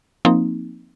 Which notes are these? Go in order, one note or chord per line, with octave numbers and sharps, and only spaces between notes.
F3 A#3 C4 D#4